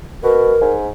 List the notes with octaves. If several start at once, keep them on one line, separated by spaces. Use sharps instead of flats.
B2 A#4
G#2